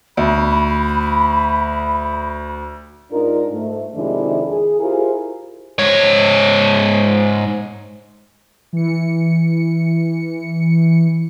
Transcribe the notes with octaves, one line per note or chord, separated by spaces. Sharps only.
D2 B5
G#2 D4 D#4 F4 A#4
G#2 A3
F2 C3 D#3 G#3 D4 E4
G#4
E4 F4 G4 G#4 A#4 C5
G#2 C#5
E3 C#7